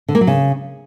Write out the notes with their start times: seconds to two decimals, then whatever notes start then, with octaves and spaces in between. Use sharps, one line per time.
0.08 D3
0.15 A#3
0.21 F#3
0.27 C#3